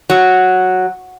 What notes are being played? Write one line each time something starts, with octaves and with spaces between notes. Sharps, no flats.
F#3